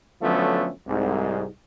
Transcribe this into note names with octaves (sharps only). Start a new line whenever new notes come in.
D3 F3 F#3 A3 B3 C#4
C2 G#2